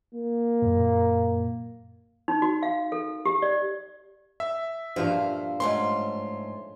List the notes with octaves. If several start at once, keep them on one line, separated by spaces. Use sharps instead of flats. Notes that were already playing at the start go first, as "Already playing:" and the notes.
A#3
F#2 A#2
D#4
F#4
F5
A4
G4
D5
E5
G2 A#2 F3 C5
G#2 A3 C#4 C6